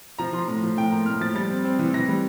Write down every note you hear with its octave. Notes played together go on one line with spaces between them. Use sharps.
F3 A#5
F3 C6
A2 A#5
F3
A2 G5
A#3 A#5
A2 F6
F3 A6
G3 A6
C4
C4
E3
E3 A#6
G3